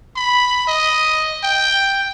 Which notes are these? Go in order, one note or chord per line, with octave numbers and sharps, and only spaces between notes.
B5
D#5
G5